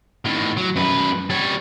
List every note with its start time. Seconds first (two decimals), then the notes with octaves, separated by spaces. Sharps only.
0.25 A2 D#3
0.57 F#3
0.76 F#2 B4
1.30 G3 C#5